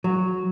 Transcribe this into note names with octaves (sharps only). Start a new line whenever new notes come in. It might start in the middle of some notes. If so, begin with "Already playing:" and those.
F#3